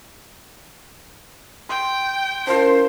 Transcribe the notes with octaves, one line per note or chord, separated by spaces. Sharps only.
G5 C6
C#4 E4 F4 A#4 C5 A5